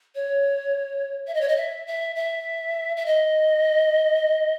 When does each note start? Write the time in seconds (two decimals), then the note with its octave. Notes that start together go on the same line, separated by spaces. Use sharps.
0.15 C#5
1.27 E5
1.34 D#5
1.41 C#5
1.48 D#5
1.57 E5
1.87 E5
2.16 E5
2.97 E5
3.06 D#5